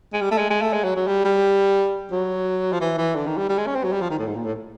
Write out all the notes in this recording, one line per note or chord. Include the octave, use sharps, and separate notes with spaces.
G#3
G3
A3
G#3
G#3
A3
G#3
F#3
F#3
G3
G3
F#3
F3
E3
E3
D3
D#3
G3
G3
G#3
C#4
C4
F#3
G3
F3
D#3
A2
G#2
A#2
A2